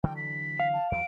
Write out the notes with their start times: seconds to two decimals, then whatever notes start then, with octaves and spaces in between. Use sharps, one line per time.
0.04 D3 E3 F#3 G5
0.17 B6
0.60 F5
0.74 A5
0.92 E2 F#3 D7